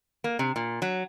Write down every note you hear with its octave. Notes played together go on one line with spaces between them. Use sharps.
A#3
C3
A#2
F#3